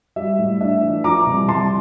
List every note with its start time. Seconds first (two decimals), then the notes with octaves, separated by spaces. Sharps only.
0.16 G3 E5
0.39 A2
0.60 D4 E5
0.82 E3
1.04 F3 A#5 D6
1.26 C2
1.48 C2 A5 C6